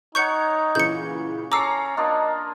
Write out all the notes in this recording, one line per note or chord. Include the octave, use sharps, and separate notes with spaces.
D#4 C#5 F#5 C#6 G6 C#7
A#2 C#3 E3 G6 C#7
C#4 A4 A#5 D6 E6 C7 C#7
A#3 D4 F4 D#5